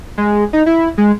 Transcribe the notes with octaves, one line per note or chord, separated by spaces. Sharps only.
G#3
D#4
E4
G#3